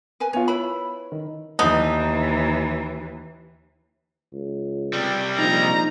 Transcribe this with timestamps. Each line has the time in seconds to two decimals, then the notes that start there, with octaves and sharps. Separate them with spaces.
0.20 A#4 B4 G#5
0.33 B3 F4 C#5
0.48 E4 B4 C#5 B5
1.12 D#3
1.59 D#2 D3 E3 B3 D#4
4.32 C#2
4.93 C3 G3
5.38 A#1 D#4 A#5